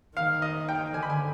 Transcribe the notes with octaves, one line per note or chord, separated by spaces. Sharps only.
D#3 F5
D#5
G5
D3 G#5
B5
G#5